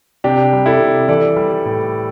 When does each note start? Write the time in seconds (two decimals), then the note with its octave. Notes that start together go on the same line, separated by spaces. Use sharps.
0.24 C3 D4 G4
0.53 G3
0.66 E4 A4
0.80 C3
1.08 E3 A4 D5
1.37 G3
1.65 A2